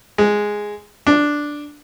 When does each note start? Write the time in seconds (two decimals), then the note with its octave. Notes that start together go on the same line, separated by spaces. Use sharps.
0.18 G#3
1.07 D4